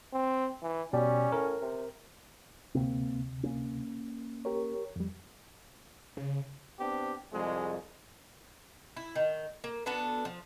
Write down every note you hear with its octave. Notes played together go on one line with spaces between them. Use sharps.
C4
E3
B2 G3 C#4
A2 A#4
C3
D2 C3 A#3 C4
A#3 C#4
G4 A#4 C#5
F2 G3
C#3
B3 C4 D4 G4
C2 F2 G#3
E4
D#3
A#3
B3 D4 F#4 A4
F3